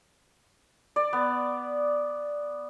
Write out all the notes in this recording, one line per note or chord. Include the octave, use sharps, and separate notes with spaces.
D5
B3